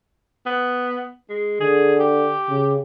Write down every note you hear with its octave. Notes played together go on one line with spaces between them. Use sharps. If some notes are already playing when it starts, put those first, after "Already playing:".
B3
G#3
D3 G#4
G4
C#3